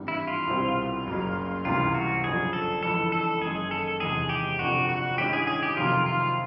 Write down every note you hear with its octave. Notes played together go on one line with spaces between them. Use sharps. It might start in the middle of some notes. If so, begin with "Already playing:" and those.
Already playing: G#1 G2 E3 G3
E4
F4
C2 B2 G3 C4 E4
F#1 F#2 C#3 F#3 A#3
C#2 C3 E3 G3 A#3 F4
F#4
G1 F#2 C#3 F3 G#4
A4
F2 C#3 E3 G#3 A4
A4
F#1 F#2 D#3 G#3 G#4
A4
E1 E2 C3 D#3 G#3 G#4
G4
G1 F2 C3 F3 F#4
F#4
G2 D#3 G#3 C#4 E4 G4
G#4
G#4
G4
F2 C3 D#3 F#3 A#3 F4
F4